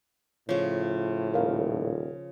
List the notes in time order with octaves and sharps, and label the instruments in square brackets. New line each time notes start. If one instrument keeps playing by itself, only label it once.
[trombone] A2 [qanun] C#3 F3 [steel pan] C#5
[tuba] D#1 [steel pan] A#4 F5